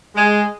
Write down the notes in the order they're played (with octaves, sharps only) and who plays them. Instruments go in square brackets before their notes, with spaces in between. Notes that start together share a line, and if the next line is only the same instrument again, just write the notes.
[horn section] G#3